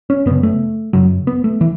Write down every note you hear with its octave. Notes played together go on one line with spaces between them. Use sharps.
C#4
F#2 C#3 B3
A3
F#2 C#3 F#3
B3
A3
E3